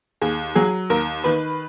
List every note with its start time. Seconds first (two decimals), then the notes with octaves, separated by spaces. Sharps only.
0.21 D#2 G#4
0.55 F#3 G#4
0.90 D#2 A#4
1.24 D#3 B4